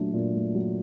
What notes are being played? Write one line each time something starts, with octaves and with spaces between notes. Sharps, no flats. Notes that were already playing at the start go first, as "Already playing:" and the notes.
Already playing: A#2 F#3 A3 D4
A#2
A3
F#3